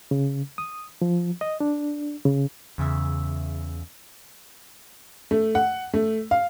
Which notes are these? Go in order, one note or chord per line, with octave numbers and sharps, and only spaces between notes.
C#3
D#6
F3
D#5
D4
C#3
E2 C#3 E5
A3
F#5
A3
F5